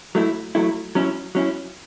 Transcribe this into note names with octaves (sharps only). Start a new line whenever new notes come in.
F#3 A3 E4
F#3 A3 E4
F#3 C#4 E4
F#3 C#4 E4